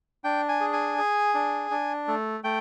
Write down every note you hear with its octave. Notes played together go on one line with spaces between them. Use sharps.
D4 G5
G#5
G#4
G#5
G#4
D4
D4
A3
A3 G5